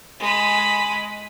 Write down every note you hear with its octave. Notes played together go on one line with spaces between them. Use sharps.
G#3 B5